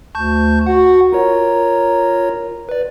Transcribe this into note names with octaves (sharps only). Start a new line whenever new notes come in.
D2 A5 C#6 G6
F#4 F#5
F4 A#4 C#5
B4 D5